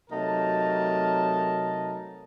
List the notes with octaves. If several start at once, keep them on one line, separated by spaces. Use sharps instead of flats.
C3 F#3 A3 D#4 A#4 A5